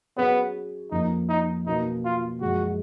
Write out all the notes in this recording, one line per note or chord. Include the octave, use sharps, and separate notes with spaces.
F#3 B3 C#4 G#4 C#5
F2 F3 A#3 C#4 D#4
D#4
B2 F#3 A#3 C#4 D#4 F#4
F4
F#2 F3 G#3 F#4